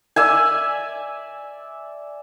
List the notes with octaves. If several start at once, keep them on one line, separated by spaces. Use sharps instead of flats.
D5 E5 G#5